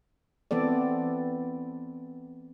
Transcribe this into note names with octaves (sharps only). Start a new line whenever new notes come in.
E3 B3 C4 A4 D5